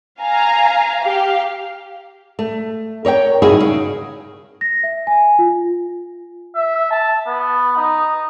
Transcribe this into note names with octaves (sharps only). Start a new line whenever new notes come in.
F5 G#5 A#5
G4 F5
A3
A#4 C#5 D#5 G5
G2 D#3 E4 F#4 G#4
C#3
A#6
E5
G#5
F4
E5
A5
B3
D#4